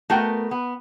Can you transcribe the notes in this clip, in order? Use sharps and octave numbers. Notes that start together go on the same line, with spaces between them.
A3 B3 F#4 A#4 G5
B3